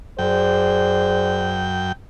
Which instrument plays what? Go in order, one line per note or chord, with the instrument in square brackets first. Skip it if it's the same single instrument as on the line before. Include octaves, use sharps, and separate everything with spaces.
[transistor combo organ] F#2 G5 [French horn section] G#4 C5 D5